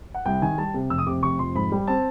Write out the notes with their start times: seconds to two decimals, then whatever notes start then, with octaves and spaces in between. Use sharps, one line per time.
0.14 F#5
0.26 C2 G5
0.42 D#3 G#5
0.58 G3 A5
0.74 C3
0.90 F1 E6
0.98 D#6
1.06 C3 D6
1.23 F1 C#6
1.39 F2 C6
1.55 G#2 B5
1.72 G3
1.87 C4 A5